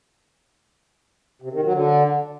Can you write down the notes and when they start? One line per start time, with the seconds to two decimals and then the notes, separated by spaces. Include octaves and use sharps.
1.42 C3
1.53 D#3
1.63 F#3
1.74 D3